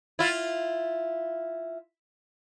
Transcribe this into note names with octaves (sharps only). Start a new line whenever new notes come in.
E4 F4